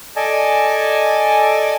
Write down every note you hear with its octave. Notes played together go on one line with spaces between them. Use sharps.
A4 D5 D#5 G#5 A5